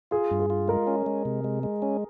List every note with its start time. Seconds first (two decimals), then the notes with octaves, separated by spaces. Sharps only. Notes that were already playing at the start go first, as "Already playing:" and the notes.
0.11 F4 G#4
0.31 G2
0.40 G#4
0.50 F4
0.68 G#3 A#4
0.87 C#4
1.06 G#3
1.25 C3
1.44 G#3
1.63 G#3
1.82 C#4